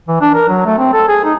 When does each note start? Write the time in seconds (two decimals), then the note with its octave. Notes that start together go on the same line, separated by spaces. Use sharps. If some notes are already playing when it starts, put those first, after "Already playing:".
0.08 E3
0.21 D4
0.35 A#4
0.49 F#3
0.66 A3
0.78 C4
0.93 A4
1.08 G#4
1.25 D#4